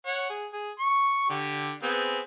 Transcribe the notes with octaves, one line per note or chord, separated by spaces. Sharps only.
C#5 F#5
G#4
G#4
C#6
D3 G4
B3 C4 G#4